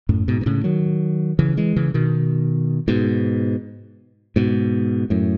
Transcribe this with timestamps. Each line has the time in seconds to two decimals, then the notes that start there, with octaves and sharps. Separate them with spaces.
0.09 F#2 A2
0.28 G#2 B2
0.41 B2
0.46 A2 C#3
0.64 D#3 F#3
1.39 C#3 E3
1.57 E3 G#3
1.76 C#3 E3
1.94 B2 D#3
2.88 G#2 B2
4.36 G#2 B2
5.10 F#2 A2